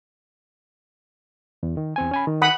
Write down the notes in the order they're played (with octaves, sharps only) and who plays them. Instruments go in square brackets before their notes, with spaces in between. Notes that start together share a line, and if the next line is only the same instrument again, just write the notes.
[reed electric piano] E2
D#3
E2 C4 G#5
C#4 G#5 B5
D#3
[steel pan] F#5 B5 D#6